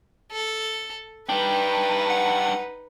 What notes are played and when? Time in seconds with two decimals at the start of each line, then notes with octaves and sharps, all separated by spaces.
0.32 A4
1.29 G3 D4 D#4 B4 G5
2.10 F#5